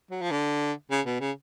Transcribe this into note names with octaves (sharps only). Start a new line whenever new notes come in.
F#3
F3
D3
C#3
B2
C#3